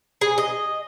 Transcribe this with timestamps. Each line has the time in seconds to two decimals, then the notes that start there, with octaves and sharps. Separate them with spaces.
0.21 G#4
0.38 D#5